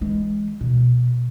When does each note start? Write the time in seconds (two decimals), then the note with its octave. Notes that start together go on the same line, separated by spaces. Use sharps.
0.01 E3 G#3
0.61 B2